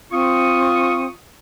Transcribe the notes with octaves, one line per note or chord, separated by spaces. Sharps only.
C4 F4 C#6 D#6